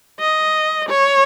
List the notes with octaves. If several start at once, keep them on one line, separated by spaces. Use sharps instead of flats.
D#5
C#5